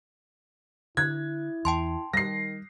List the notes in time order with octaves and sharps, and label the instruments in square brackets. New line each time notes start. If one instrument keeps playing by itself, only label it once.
[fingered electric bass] D3 [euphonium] E4 [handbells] F#6 [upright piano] G#6
[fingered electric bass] E2 [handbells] G5 A5 C6
[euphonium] D#3 [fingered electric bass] G3 [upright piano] A#6 C7